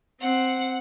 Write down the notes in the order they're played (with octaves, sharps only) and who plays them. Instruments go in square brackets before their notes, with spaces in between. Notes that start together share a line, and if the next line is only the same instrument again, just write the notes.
[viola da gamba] C4 [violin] F#5